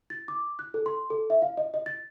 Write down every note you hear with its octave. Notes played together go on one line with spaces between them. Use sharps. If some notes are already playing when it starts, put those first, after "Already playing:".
A6
D6
F#6
A4
C6
A4
E5
F5
D#5
D#5
A6